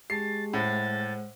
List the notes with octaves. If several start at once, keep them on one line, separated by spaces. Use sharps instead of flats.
G#3 G4 G#4 A5 A6 C7
A2 C5 F#5 A6